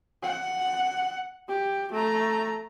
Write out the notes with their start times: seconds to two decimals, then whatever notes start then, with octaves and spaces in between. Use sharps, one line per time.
0.23 F#5
1.48 G4
1.92 A3 A#5